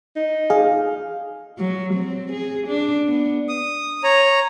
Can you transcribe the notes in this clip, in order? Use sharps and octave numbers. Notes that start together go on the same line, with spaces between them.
D#4
G#4 F5
F#3
C4
G#4
D4
B3
D#6
C#5 A#5